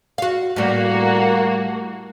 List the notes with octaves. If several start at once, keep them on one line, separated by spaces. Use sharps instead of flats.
F#4 F5
A2 G3 A#3 F#4